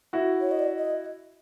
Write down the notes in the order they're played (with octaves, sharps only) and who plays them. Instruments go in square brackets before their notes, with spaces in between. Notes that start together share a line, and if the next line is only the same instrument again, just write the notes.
[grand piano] E4 F#4
[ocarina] C#5
D#5
D5
D#5